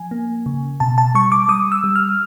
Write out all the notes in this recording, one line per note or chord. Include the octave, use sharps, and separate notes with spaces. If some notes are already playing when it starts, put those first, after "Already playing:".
Already playing: F3 G#5
A#3
C#3
B2 A5
A5
G3 C#6
D6
G3 D#6
E6
G3
F6